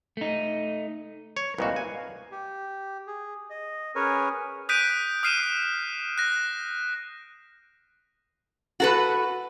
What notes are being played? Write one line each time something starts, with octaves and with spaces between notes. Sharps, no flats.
A3 D#4
C#5
C2 A#2 F#4 B4 D#5 F5
G#5
G4
G#4
D#5
C#4 G#4 A#4 B4 C#5 G#5
D#6 F#6 G6 B6 D7 D#7
D#6 F6 C7 D#7 E7
F#6 A#6
F#4 A4 B4